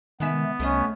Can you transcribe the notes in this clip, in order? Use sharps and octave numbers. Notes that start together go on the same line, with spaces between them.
C3 D#3 G#3 B3 E5
C2 A3 C#4 C5 D#5